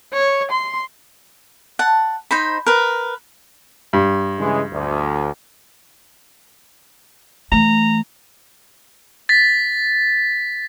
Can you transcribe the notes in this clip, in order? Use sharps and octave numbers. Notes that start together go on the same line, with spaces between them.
C#5
C6
F#5 A5
D#4 C5 B5
A#4 B4
G2
C#3 E3 G#3
D2
E3 A3 A#5
A6 B6